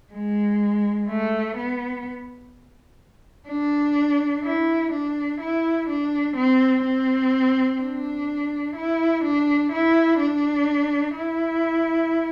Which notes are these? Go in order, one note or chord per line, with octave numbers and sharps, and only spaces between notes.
G#3
A3
B3
D4
E4
D4
E4
D4
C4
C4
D4
E4
D4
E4
D4
E4